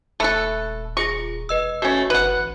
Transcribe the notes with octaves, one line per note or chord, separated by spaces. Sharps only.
D#1 A3 A4 B5 F#6
F4 G#4 C#6 A#6
E1 B4 D#5 E6
A3 C#4 F#4
G1 B4 F#5
A1